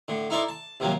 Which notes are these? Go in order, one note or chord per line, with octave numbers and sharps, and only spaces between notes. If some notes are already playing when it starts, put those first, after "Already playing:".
A2 D3
D#4 E4 A4 A#4 C5 D5
A5
D#2 C3 F3 F#3 A#3